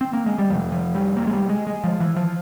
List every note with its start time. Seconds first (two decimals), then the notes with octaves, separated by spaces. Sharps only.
0.01 C4
0.13 A#3
0.26 G#3
0.38 G3
0.49 F2 C3 F3
0.72 F3
0.95 G3
1.17 A#3
1.27 G#3
1.33 G3
1.49 G#3
1.67 G#3
1.84 F3
2.00 E3
2.16 F3